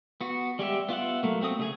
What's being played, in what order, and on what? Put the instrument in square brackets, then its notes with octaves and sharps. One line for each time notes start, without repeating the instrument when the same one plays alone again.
[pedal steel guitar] B3 F#4
G3 G#3 G4 E5
B3 F4 E5 F#5
F#3 A3 A#3
A3 C4 F#4 D#6
C#3 A3 G#4 G#5